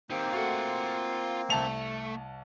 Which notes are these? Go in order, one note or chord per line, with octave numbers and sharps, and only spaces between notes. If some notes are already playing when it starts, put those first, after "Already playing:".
A#3 C4 D#4 G4
A3 F4 F#4 F#5
C2 A3 A5 F7